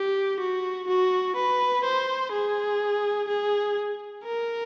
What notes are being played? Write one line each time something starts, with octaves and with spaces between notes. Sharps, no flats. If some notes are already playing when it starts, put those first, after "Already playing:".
Already playing: G4
F#4
F#4
B4
C5
G#4
G#4
A#4